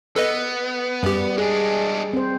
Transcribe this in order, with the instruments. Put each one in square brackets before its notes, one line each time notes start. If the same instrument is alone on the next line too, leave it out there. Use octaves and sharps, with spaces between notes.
[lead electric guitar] B3 [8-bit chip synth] A4 B4 D#5
[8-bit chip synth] F#2 G4 [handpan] G3
[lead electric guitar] G#3 D4 [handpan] G#4
[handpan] C4 C5